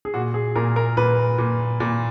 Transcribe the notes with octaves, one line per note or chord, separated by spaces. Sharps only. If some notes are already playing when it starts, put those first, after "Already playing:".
G#4
A#2 F#4
G#4
A#2 A#4
A#4
A#2 B4
A#2
A#2